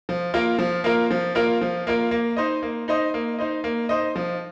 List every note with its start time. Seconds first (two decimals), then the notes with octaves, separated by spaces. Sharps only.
0.09 F3
0.34 A#3 F4 A#4
0.59 F3
0.84 A#3 F4 A#4
1.11 F3
1.35 A#3 F4 A#4
1.61 F3
1.87 A#3 F4 A#4
2.11 A#3
2.37 D#4 C5 D#5
2.63 A#3
2.88 D#4 C5 D#5
3.14 A#3
3.38 D#4 C5 D#5
3.64 A#3
3.89 D#4 C5 D#5
4.16 F3